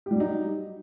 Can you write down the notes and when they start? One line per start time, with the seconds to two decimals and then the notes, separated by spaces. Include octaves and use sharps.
0.06 G4
0.11 G3
0.15 F#3
0.20 D#4